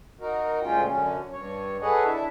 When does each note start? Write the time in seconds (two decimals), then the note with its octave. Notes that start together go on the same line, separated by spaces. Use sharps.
0.20 D#4 F#4 A#4
0.63 D2 A#2 G#3 C#4 F4 G5
0.86 F#2 D3 C#4
1.32 G2 C#5
1.82 G#4 A4 B4 C#5 D#5 F#5
2.04 D4 E4 E5